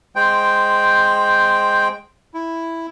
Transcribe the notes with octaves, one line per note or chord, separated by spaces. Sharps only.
G#3 C5 G5
E4